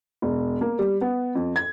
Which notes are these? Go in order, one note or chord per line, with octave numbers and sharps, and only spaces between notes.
E1
A#3
G3
B3
F2
G#6